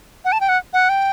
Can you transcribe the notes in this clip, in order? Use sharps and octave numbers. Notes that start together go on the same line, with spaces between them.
F#5
A5
G5
F#5
F#5
G5